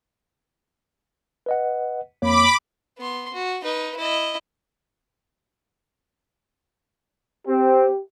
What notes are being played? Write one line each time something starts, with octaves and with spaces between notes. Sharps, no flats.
B4 D#5 F#5
F2 A#3 C#5 B5 D6
B3 C6
F#4
D#4 B4
E4 D#5
C4 G4